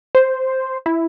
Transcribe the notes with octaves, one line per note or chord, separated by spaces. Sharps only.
C5
E4